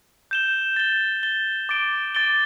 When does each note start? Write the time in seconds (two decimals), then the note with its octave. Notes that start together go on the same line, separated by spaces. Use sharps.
0.31 G6 E7 G7
0.76 A6 G7
1.23 A6 G7
1.69 D6 A6 D7 G7
2.15 D6 A6 D7 G7